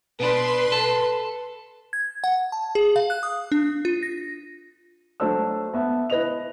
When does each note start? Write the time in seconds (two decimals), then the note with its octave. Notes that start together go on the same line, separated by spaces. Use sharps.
0.20 B2 D4 B4 C6
0.72 A4
1.93 G#6
2.24 F#5
2.52 A5
2.75 G#4
2.96 F5
3.10 F#6
3.23 D#6
3.52 D4
3.85 F4
4.03 A#6
5.20 F#3 A3 D4 C5 A5 E6
5.73 B3 E5 A5
6.10 E4 B4 D#5 F7